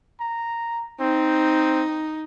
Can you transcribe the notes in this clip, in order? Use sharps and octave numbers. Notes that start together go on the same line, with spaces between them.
A#5
C4 D#4